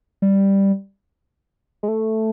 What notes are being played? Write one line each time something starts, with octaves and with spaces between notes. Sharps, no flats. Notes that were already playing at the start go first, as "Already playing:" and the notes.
G3
G#3
A3